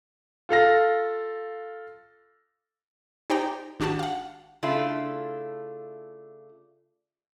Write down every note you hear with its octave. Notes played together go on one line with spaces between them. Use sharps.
F4 A4 F5 A#6
D#4 G4 C5 D5 G5 A#5
G#1 D4 F#4 G4 A5
F5 F#5
C#3 A3 D4 E4 F4